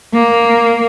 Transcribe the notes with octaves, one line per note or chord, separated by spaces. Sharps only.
A#3